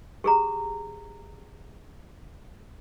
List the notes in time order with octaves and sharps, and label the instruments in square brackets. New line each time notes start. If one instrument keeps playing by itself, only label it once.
[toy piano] G4 G#4 A#5